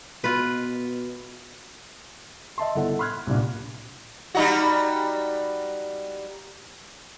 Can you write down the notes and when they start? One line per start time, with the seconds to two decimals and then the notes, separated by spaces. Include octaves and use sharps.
0.24 B2 F4 B4
2.58 D#5 E5 A5 C6
2.75 G1 E4 A4 F#5
2.99 B5 C6 F6 F#6 G#6
3.27 C2 G2 A#2
4.35 G3 D#4 F#4